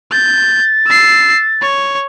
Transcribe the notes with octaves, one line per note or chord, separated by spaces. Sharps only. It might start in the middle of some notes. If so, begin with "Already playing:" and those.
G6 A6
E6 C7
C#5